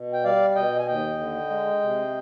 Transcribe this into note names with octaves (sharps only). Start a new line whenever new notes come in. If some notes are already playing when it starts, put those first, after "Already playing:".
Already playing: B2
G5
G3 D5 F5
B2 D#5 G5
G#5
D#2 D#5 G5
D3
G#3
C3